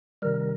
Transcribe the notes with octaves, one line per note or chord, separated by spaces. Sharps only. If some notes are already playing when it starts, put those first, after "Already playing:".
C3 D#3 G3 A#4